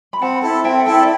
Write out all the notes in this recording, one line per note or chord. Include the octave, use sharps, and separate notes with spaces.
B5
C4 F#5 A5
E4 A4
C4 E5 G5
F#5
E4 A4 E5 G5
D5